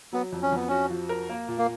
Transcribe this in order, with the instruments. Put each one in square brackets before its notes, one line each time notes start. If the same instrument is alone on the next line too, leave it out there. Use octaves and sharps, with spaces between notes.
[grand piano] F#3 [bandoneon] B3
[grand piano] F2
[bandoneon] C#4
[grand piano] F2 [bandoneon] B3
[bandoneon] C#4 [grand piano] F#4
[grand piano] F3
A#4
A#3
A#2
[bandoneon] A#3